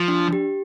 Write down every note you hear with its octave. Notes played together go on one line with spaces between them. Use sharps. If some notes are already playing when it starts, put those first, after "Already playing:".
Already playing: F3
D4
G4